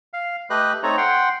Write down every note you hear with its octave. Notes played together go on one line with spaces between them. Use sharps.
F5
A3 G4 B4 D#5 F#6
A3 C4 D#4 A4 C#5 A#5
F#5 G5 C6